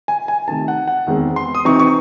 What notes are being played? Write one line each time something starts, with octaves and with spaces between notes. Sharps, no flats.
G#5
G#5
C3 D#3 A3 D#4 A5
F#5
F#5
E2 D#3 G#3 C4
C6
D#6
C3 E3 C4 D#4 C#6
C#6